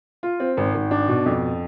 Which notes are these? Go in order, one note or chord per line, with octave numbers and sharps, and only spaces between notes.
F4
C4
G#1
G#1
D4
B2
F2